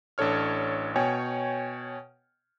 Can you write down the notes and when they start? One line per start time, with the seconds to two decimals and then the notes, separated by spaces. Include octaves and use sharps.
0.18 A1 D4 A4 C#5 F6
0.96 B2 C#5 G5 G#5